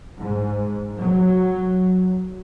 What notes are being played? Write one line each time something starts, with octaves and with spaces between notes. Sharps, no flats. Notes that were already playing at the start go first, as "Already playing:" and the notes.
G#2
F#3